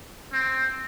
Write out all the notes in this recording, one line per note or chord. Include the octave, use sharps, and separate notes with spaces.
C4